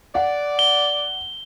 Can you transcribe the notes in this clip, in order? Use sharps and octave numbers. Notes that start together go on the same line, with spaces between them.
D5 F#5
G7